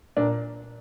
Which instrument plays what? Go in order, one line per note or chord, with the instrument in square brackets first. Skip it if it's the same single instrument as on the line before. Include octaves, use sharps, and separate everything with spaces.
[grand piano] A#2 D4